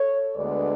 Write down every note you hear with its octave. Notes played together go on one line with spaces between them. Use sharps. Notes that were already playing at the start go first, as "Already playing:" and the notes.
Already playing: A4 C#5
D2 D3 G#3 B3 B4 D5